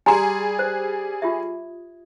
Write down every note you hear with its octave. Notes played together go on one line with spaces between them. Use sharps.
G3 G#4 G#5 A#5 C6
C5
F4 G4 E5